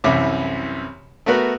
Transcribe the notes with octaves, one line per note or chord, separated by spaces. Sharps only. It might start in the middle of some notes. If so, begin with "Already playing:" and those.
C2 F#2 E3 E5 D6
A3 B3 F#4 A#4 B4